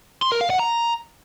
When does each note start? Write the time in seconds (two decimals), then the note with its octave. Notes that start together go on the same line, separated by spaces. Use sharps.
0.22 C6
0.32 A#4
0.41 F5
0.50 F#5
0.59 A#5